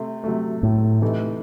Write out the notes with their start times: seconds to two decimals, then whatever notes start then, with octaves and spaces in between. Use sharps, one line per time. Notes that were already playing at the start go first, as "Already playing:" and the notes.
Already playing: C3 A3
0.24 C3 F#3 A3
0.63 A2
1.02 C3 E3 A3 D#4 A4